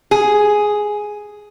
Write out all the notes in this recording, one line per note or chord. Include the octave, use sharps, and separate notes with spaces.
G#4